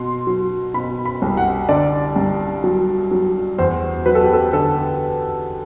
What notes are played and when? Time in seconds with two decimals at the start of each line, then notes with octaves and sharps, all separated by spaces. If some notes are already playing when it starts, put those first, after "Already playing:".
Already playing: B2 C6
0.27 F#3
0.74 B2 B5
1.06 B5
1.22 C2
1.37 F#5
1.69 D3 D5
2.16 G2
2.64 F#3
3.11 F#3
3.58 E2 C5
4.06 F#3 B4
4.15 A4
4.24 G4
4.33 A4
4.53 D3 A4